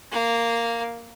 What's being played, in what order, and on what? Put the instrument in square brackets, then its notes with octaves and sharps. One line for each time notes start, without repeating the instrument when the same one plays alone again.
[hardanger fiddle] A#3 F5